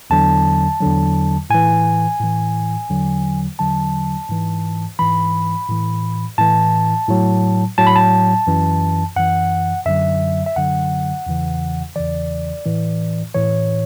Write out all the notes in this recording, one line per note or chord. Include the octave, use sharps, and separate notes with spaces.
E2 D3 F#3 A5
E2 D3 F#3
A2 E3 G#5
A2 E3
E2 D3 F#3
E2 D3 F#3 A5
G#2 E3
G#2 E3 B5
A2 E3
A2 E3 A5
A2 F#3
A2 F#3 A5
B5
A5
F#2 E3
F#2 E3 F#5
F#2 D3 F#3 E5
E5
F#2 D3 F#3 F#5
E2 C#3 E3
E2 C#3 E3 D5
A2 E3
A2 E3 C#5